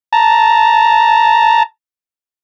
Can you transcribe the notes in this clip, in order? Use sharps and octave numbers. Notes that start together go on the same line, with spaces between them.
A5 A#5